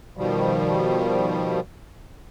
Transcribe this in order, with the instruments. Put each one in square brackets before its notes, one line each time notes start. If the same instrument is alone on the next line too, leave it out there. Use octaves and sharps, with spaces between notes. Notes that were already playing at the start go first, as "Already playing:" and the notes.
[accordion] B2 D#3 F3 G3